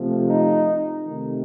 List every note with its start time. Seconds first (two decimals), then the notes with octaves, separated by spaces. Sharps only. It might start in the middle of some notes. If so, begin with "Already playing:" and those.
Already playing: C3 F3 A3
0.26 D#4
1.02 C3 D#3 A3